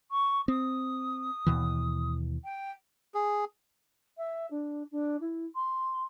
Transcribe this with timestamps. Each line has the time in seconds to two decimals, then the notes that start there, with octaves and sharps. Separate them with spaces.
0.11 C#6
0.48 C4 D#6
1.46 D#2 B2 E3
2.44 G5
3.14 G#4
4.17 E5
4.50 D4
4.91 D4
5.20 E4
5.55 C6